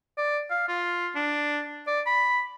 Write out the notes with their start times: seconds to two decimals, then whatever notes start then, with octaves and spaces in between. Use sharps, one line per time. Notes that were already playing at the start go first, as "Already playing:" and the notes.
0.17 D5
0.51 F5
0.68 F4
1.15 D4
1.87 D5
2.06 B5